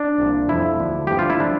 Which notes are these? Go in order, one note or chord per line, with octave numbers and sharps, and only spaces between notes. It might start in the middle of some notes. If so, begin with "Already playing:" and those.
Already playing: D4
C2 A#2 F3
F2 C3 F3 E4
D2 D3 F3
G2 D3 F3 G4
F4
E4
F3 D4